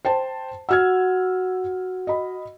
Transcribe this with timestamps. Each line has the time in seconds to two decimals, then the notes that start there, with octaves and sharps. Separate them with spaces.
0.05 C5 G5 A5
0.69 F#4 F#5 E6 F6 G#6
2.07 D#5 B5